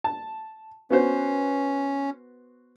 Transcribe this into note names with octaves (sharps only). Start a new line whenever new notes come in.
A5
B3 C#4 F#4 C5